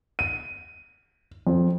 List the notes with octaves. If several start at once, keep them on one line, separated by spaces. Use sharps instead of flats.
D#7
F2